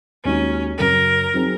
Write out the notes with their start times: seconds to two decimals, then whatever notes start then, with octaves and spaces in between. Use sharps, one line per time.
0.24 D#2 D#3 G#3 C#4 D#4 F#4
0.79 F#2 C#3 F#3 A#4
1.34 F#3 C4 D#4 G#4